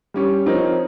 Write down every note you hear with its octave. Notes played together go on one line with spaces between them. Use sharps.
G3 C#4 G4 C#5
F3 C4 D#4 A#4 C#5